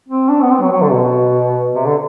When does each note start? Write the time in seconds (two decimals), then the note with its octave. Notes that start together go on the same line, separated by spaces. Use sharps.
0.08 C4
0.29 D4
0.42 B3
0.50 C4
0.61 F#3
0.71 F#3
0.82 D3
0.91 B2
1.75 C3
1.85 D3